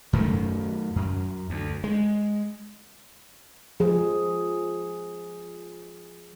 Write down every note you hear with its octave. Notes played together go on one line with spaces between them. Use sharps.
F#2 D#3 A3
F#2
D2
G#3
F3 G#4